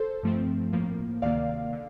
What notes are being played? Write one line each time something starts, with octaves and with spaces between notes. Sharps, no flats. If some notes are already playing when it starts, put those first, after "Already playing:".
Already playing: A4 C5
G2 F3 A3 C4
A2 F3 A#3
D2 C3 D#3 A#3 D5 F5
D3